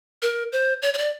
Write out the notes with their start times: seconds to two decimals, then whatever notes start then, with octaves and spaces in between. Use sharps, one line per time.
0.22 A#4
0.52 C5
0.82 C#5
0.94 C#5
0.98 D5